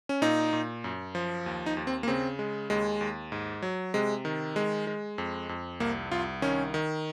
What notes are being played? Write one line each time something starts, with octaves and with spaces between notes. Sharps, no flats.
C#4
A#2 D#4
A#2
F#2
F3
D#2
D#4
D#2
C4
A#3
C#3 C4
G#3
D#2 G#3
D#2
G#2
F#3
C3 G#3
D#3
G#3
G#3
F2
F2
C2 A#3
C2 F4
D#3 C#4
D#3